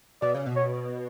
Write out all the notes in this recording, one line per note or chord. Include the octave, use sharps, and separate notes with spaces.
B2 D5
C#3
B2
C#5